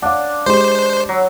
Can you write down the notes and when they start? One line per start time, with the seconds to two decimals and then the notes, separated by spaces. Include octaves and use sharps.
0.02 D4 F5 F#5
0.46 G#3 G4 C5 C6
1.09 F#3